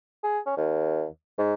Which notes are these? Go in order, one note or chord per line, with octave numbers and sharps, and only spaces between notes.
G#4
C#4
D#2
G#2